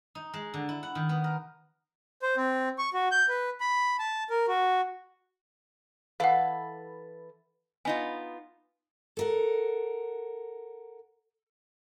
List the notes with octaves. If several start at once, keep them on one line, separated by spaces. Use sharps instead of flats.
D#4
G#3
D3
E4
F#5
D#3
B3
A#4
C5
C4
C#6
F#4
G6
B4
B5
A5
A#4
F#4
E3 A4 B4 F5 F#5
B3 D#4 F4 G#5
A4 A#4 F#5